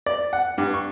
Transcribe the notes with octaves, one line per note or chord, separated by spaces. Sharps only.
D5
F#5
G2
C#6